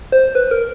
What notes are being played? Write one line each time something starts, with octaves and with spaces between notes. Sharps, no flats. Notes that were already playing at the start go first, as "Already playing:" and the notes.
C5
B4
A#4